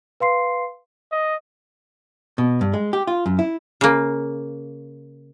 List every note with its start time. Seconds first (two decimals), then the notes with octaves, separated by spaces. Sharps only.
0.20 B4 F5 C6 C7
1.12 D#5
2.38 B2
2.61 G2
2.74 G#3
2.93 G4
3.07 F4
3.26 F#2
3.39 E4
3.81 C#3 A#3